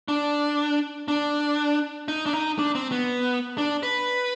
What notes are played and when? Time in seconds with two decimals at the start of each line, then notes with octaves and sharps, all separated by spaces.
0.08 D4
1.08 D4
2.08 D#4
2.26 D4
2.33 D#4
2.59 D4
2.75 C4
2.92 B3
3.58 D4
3.83 B4